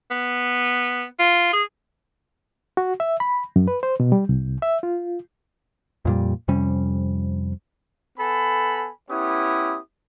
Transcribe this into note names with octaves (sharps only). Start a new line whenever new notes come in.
B3
F4
G#4
F#4
E5
B5
F#2
B4
C5
B2
G3
C2
E5
F4
F2 A#2 G3
F2 C3 G3 C#4
B3 A4 G#5 B5
B3 C#4 E4 G4 D#6